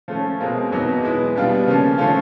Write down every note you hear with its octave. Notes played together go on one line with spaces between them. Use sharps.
F3 A3 C#4
B2 G#3 C4 F4 A#4
E2 B2 F#3 B3 D#4
G#3 B3 E4
B2 G3 B3 D4 F4
C#3 F3 A#3 C#4
D3 F3 A3 C#4 F4